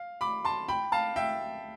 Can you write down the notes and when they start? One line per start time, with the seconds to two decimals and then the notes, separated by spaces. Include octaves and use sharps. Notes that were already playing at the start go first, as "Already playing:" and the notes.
Already playing: F5
0.21 B5 D6
0.45 A5 C6
0.68 G5 B5
0.92 F5 A5
1.16 E5 G5